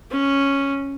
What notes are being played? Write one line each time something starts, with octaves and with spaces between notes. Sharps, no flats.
C#4